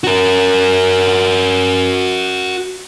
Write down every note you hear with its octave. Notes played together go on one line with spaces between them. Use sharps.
F#4 A#4